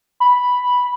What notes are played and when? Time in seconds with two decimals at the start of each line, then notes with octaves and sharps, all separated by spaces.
0.20 B5